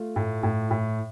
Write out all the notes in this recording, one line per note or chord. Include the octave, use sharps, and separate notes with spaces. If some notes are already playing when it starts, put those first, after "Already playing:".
Already playing: A3 F4
A2
A2
A2